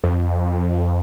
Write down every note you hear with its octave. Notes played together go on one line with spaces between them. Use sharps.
F2